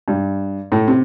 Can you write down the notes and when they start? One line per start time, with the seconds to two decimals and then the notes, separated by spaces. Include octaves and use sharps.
0.08 G2
0.72 A2
0.88 C3